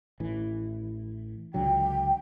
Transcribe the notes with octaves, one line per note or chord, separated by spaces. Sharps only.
A1 E3
C#2 D3 F#3 G5